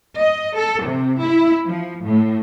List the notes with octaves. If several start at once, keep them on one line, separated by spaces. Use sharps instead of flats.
D#5
A4
C3
E4
F3
A2